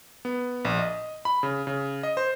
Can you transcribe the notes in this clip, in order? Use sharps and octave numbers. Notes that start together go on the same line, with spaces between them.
B3
A#1
D#5
B5
C#3
C#3
D#5
C5